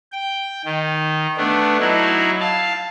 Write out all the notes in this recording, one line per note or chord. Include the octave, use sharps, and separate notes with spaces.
G5
D#3
A3 B3 D4
F#3 D#4 E4
F5 A5